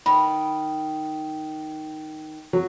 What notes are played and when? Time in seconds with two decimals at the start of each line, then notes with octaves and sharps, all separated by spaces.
0.06 D#3 B5
2.53 F#3